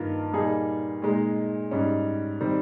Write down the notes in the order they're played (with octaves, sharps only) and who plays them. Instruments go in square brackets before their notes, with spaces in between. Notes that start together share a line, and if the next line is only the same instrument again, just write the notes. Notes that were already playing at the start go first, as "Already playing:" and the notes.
Already playing: [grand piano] G2 D#3 A#3 F4 A#4
A#2 G3 A#3 D#4 G#4
A#2 G#3 D#4
G#2 G3 C#4
D#3 G3 C4